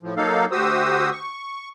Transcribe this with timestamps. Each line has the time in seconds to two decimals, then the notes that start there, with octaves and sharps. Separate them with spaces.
0.03 A2 F3
0.17 F#3 A#3 D#4 A4 F5
0.52 D2 F#4 G4 C5 D#6 E6
1.12 C#6